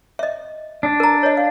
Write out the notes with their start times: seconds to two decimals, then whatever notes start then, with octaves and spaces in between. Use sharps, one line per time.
0.19 D#5 E5
0.83 D4
1.00 A#4 A#5
1.23 C#5 D#5
1.37 F5